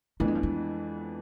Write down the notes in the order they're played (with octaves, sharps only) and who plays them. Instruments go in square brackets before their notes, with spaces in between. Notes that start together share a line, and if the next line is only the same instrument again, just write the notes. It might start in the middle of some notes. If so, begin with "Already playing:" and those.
[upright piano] F2 E3 B3 D4 [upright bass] A3
[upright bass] G#3
F3
G#3